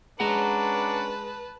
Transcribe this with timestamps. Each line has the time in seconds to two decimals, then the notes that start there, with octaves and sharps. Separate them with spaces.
0.20 G#3 C#4 D4 B4 F#5 A5 A#5